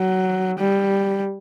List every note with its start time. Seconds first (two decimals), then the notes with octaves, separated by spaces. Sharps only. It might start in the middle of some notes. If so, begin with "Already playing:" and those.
Already playing: F#3
0.59 G3